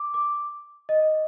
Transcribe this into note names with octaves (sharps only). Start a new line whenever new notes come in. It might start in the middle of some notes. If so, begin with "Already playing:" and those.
Already playing: D6
D6
D#5